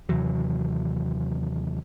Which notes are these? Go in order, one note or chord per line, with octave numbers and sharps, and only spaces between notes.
D#2 C3 E3 F#3